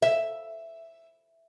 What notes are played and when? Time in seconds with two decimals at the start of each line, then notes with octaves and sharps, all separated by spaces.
0.02 E5